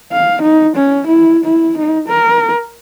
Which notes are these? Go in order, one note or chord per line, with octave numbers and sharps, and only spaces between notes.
F5
D#4
C#4
E4
E4
D#4
A#4